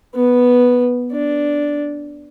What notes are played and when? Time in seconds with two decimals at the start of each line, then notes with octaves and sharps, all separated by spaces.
0.15 B3
1.12 D4